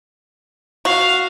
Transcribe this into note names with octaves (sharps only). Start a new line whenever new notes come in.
F#4 F5